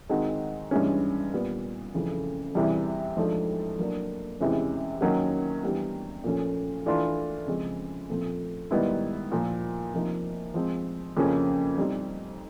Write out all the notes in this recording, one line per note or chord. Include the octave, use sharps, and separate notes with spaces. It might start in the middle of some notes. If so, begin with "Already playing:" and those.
D#3 G#3 C4 D#4 F#4
G2 E3 G#3 C#4
A#2 G3 B3
F2 C#3 E3 A3
E2 C3 E3 G3
G#2 F3 A3 D4
F#3 A#3 D4
E2 C3 E3 G#3 C#4
D#3 F#3 A#3 C#4 F#4
E3 G3 B3 D4 G4
A#2 F3 A3 C#4
E3 A3 D4 F4
C#3 F3 G#3 C4
A#2 F3 A3 C4
G#2 D#3 G3 B3 E4
A#2 F3 A#3
C3 F3 A#3 D#4
F3 G#3 C4
F2 C#3 F3 A#3 C#4
G3 C4 D#4 G4